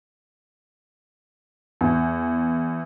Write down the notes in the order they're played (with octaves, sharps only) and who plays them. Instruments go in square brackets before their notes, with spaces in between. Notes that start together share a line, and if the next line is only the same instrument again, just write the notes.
[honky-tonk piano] E2